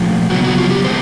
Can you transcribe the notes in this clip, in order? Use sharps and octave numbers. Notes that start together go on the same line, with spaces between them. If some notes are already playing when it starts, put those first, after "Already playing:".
Already playing: A#2 F3 A3
C#3 F#3 B3 F#4
F#4
F4
G4
D#3 G#3 B3 C5